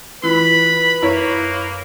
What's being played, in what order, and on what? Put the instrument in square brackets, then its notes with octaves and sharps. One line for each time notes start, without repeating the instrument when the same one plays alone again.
[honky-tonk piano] E3 [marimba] E4 F4 [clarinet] B4 [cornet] B5
[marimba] F#2 [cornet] A#3 [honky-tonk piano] E4 C#5